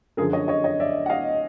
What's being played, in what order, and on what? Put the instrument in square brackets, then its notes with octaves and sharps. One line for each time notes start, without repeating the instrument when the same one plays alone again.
[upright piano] F#2 D3 F3 G#4 A#4
C#5 D#5
C#5 D#5
C#5 D#5
D5 E5
F#5
D#5 F5